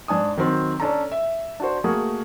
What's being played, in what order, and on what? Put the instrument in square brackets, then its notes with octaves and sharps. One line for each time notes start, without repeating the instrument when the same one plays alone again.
[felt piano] G#2 D4 G#5 D#6
D#3 F#3 C4
C#4 D4 A4 A#5
E5
D4 F#4 C5
A3 A#3 F#4 G#4